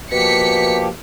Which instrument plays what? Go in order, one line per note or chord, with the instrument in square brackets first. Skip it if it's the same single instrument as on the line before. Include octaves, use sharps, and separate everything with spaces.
[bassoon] B2 [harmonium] F3 A#3 G4 [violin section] B6 C#7